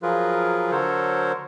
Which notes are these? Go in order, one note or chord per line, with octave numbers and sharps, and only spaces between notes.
F3 F#3 F4 G#4 A#4 B4
D3 F#3 A4 A#4 C5 C#5